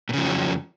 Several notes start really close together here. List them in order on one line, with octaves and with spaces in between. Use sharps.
A#2 C#3 F3 F2 F#3